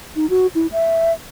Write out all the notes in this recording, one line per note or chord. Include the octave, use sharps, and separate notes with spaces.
D#4
F#4
E4
E5